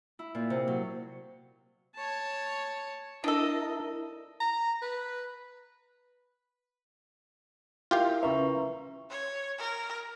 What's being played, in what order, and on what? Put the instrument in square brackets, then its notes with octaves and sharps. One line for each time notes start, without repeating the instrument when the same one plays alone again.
[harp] E4
A#2
C3
F#3
[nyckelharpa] C#5 A5
[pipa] D4 A4 [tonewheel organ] E4 A#4 [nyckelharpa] D#5
[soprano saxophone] A#5
B4
[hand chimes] E4 A#4 E5 [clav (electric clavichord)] F4 G4 F5
[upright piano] C#3 E5 [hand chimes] B4 A#5 C#6
[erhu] C#5
A#4